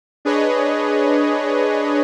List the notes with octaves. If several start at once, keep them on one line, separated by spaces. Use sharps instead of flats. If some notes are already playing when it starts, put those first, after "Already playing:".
D4 G#4 B4 C#5 D#5